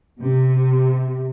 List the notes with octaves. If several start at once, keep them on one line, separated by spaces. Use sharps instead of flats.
C3